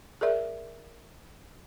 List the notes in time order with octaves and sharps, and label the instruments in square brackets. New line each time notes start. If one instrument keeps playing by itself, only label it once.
[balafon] G#4 A#4 D5 E5